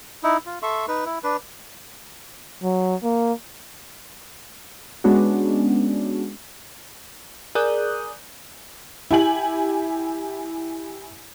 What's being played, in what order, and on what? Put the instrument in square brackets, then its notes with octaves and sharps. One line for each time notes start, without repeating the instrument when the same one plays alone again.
[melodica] D#4 E4
F4
A4 E5 C6 C#6
D#4 B4
E4
D4 B4
[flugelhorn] F#3
A#3
[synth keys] G#3 B3 C#4 D4 F#4
[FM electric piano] G#4 A#4 D5 D#6 F#6 G6
[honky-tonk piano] E4 G4 G#5 F#7